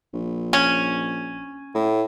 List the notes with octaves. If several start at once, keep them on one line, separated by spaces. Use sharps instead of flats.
A#1
C#4
A2